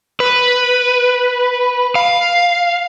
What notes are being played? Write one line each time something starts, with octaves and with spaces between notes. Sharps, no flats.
B4
F5